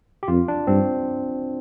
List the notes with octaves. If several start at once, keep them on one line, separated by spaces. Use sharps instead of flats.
G4
F2 F4
D4
G2 C4